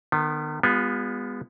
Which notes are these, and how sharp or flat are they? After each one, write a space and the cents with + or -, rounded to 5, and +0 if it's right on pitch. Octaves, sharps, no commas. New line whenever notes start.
D#3 -40 B3 +0
G#3 -35 B3 +0 F4 +30